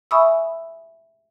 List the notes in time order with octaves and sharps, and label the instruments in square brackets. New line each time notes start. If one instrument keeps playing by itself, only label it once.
[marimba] E5 G#5 B5 C#6 D#6 E6